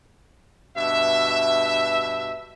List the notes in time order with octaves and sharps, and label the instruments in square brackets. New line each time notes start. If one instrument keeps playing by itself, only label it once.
[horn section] G2 B2 E5